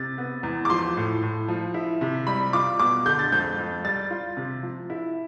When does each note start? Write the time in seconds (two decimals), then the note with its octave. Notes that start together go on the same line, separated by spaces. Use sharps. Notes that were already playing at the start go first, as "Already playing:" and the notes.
Already playing: C3 A6
0.18 B3
0.43 E2
0.65 D6
0.70 F3 C6
0.97 A2
1.23 A2
1.48 F3
1.74 E4
2.01 C3
2.27 G3 B5
2.53 F4 D6
2.79 B2 D6
3.05 D3 G6
3.19 A6
3.32 F2 G6
3.58 F2
3.84 G3 A6
4.10 F4
4.37 C3
4.63 F3
4.90 E4